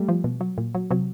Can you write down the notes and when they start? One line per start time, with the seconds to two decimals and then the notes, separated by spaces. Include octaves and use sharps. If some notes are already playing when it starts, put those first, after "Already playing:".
Already playing: G3 A3
0.09 F3
0.24 B2
0.41 F#3
0.58 A#2
0.75 F#3
0.91 C3 F#3